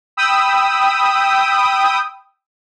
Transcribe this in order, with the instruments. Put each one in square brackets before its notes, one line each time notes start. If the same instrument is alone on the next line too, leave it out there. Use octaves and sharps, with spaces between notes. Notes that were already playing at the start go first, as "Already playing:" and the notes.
[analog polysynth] G5 B5 D#6 E6